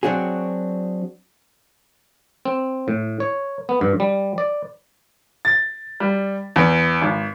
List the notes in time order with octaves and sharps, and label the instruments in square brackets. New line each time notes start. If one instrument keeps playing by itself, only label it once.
[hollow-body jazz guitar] F#3 C4 D4 F#4 G#4
[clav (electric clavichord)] C4
A2
C#5
B3
G2
G3
D5
[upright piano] A6
G3
E2
G#1